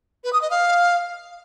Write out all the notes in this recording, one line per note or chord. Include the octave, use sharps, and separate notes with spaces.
B4
D#6
D#5
F5